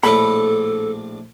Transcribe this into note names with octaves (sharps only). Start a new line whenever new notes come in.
A#1 A2 D4 A4 B5